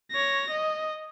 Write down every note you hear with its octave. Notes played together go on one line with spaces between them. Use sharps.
C#5 A#6
D#5